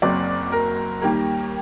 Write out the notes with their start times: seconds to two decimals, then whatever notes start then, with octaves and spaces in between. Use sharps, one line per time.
0.02 F#1 F#2 F#3 C4 D5
0.52 A#4
1.02 D#2 D#3 G3 A#3